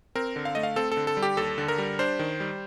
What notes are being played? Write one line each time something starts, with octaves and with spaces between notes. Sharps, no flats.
C4 A#4
D3
F5
A3 D#5
F5
C4 A4
A4
D3
A4
G3
G4
D#2 A4
D3
A#4
G3
D4 C5
D#3
G3